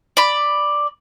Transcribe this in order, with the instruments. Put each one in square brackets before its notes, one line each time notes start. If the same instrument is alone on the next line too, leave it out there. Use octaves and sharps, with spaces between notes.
[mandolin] D5 B5